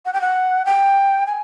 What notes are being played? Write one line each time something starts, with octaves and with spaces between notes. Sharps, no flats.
F#5
G5
F#5
G5
G#5